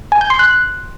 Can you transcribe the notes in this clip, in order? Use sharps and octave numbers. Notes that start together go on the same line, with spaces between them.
G#5
G6
C6
F#6